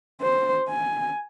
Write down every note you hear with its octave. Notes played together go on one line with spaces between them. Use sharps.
C5
G#5